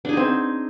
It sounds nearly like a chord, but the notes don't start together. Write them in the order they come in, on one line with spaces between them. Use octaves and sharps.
D4 G#4 D#4 C4